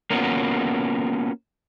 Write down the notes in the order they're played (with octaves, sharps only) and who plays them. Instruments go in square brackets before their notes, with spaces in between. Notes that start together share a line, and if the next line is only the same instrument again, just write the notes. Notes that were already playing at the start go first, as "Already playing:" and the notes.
[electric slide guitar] A#3 B3 C#4 F4 F#4